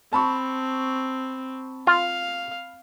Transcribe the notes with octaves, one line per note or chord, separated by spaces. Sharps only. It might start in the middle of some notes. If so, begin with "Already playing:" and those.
C4 A5 B5 C#6
F4 F5